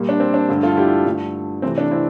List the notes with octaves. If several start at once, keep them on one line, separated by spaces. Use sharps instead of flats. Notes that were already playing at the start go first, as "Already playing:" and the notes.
Already playing: A#2 G3 A#3
D4
C4
D4
G2 D3 A3
F4 A4
E4 G4
G2 D3 A3
C3 E3 A3 C4 E4
D4
C4 E4